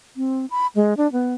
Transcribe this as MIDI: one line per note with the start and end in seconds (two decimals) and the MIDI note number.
0.17 0.46 60
0.51 0.67 83
0.76 0.94 56
0.97 1.10 62
1.12 1.35 59